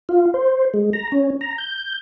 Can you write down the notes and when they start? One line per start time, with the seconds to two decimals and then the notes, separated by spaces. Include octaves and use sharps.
0.09 F4
0.34 C5
0.74 G#3
0.93 A#5
1.12 C#4
1.41 A#5
1.58 G6